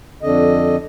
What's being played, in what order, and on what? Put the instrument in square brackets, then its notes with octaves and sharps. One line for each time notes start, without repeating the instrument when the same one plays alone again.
[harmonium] F2 D3 D#5